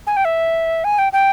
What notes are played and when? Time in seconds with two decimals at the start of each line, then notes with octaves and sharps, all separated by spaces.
0.07 G#5
0.17 G5
0.25 E5
0.84 G#5
0.99 G5
1.13 G5